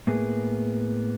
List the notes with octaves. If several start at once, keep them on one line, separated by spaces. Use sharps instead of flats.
A2 A#3 B3 G#4